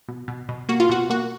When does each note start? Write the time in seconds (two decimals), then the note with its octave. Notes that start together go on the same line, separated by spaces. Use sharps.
0.08 B2
0.28 B2
0.49 B2
0.69 A#3 F#4
0.80 F4
0.89 B2 F#4
1.10 A#3 F#4